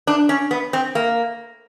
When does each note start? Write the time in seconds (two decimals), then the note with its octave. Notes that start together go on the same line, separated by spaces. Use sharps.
0.07 D4
0.29 C#4
0.51 B3
0.73 C4
0.95 A#3